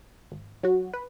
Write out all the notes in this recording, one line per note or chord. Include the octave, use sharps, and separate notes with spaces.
G#1
F#3 F#4
B4